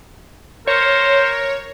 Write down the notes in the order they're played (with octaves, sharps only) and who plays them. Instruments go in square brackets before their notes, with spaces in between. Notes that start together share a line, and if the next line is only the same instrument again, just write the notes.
[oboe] A#4 [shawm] C5 [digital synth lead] C#5